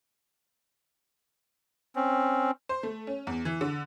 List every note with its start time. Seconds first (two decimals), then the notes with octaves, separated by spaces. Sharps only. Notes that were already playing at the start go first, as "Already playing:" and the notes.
1.96 C4 C#4
2.69 C5
2.83 A3
3.07 C#4
3.27 E2
3.45 E3
3.61 D3